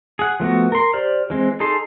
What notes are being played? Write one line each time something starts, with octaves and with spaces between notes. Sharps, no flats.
G#4 F#5
F3 A3 B3 F#4
A#4 C6
G4 C5 D5 F6
E3 G#3 C4
D#4 G#4 A4 A5 C6